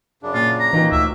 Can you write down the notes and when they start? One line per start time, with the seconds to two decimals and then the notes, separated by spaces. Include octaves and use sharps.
0.23 F#2 C#3 D4
0.34 A#2 F4
0.60 A#5
0.73 A#2 D#3 E3 F#3 A#3 D#4
0.92 D2 E5